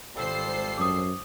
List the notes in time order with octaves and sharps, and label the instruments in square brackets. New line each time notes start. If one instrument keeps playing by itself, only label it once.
[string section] G#1 C5 C7 [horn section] F3 G3 A4
[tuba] F#2 [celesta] D6 D#6